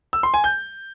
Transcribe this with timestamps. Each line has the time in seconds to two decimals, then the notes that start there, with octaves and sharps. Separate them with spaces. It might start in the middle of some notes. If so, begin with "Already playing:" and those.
0.13 E6
0.23 C6
0.34 G#5
0.44 G6